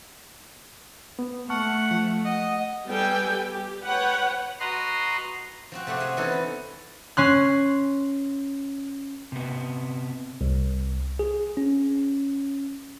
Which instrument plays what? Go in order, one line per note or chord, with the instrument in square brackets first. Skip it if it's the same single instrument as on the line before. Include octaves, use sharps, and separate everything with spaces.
[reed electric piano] B3
[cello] A3 [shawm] F#5 [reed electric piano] A5 C#6 F6
[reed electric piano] F3
[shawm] D#5 [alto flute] F#5
[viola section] G3 B3 A4 G5 G#5
G4
B4 C#5 F#5 G5
[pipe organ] F#4 B4 D#5 A#5 C6
[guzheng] F3 C4 F#4
C3 A3 F#4 E5 F#5 C6
G#4 E5 G#5
E3 B3 C#4 D#4 A4
C#4
[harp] C#4 C6 F#6
[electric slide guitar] C3 B3
[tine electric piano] C2
G#4
C#4